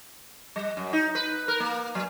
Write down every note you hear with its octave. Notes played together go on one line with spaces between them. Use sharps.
G3
F#2
D#4
B4
A#4
A#3
F#3